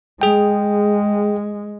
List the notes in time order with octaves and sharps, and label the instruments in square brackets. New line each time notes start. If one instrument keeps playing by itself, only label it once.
[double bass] G#3 [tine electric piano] G#4 G5